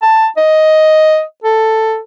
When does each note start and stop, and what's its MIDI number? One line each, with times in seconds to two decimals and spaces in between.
0.02 0.27 81
0.37 1.22 75
1.44 1.99 69